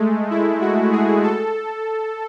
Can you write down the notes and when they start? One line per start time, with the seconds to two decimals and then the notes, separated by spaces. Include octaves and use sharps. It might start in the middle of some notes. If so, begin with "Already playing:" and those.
Already playing: G#3 A3
0.31 E4
0.61 F#4
0.92 G#4
1.24 A4